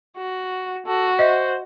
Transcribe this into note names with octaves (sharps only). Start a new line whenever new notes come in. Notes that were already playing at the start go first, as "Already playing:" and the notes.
F#4
F#4 A4
C5 D#5 E5